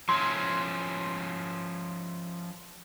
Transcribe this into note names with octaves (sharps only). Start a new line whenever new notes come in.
F3 C#4 E4 C6